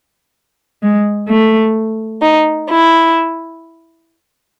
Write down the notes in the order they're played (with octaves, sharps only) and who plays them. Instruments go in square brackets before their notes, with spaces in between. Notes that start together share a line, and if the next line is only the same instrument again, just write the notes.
[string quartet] G#3
A3
D#4
E4